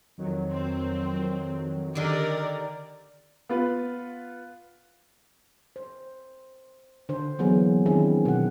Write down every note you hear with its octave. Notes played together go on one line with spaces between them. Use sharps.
F2 D#3 F#3
C4
D3 D#3 G4 A#4 D5
B3 F4 B4
C5
D3 C5
E3 F#3 A#3 B3 G#4 C5
D#3 C4 D4 E4 G#4
B2 F#5